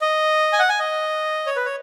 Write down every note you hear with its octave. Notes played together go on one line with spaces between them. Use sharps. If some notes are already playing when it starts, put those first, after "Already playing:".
D#5
G#5
F#5
G#5
D#5
C#5
B4
C#5